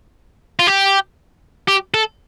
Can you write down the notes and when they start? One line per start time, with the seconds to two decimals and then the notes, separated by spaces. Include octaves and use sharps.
0.59 F4
0.67 G4
1.68 G4
1.94 A4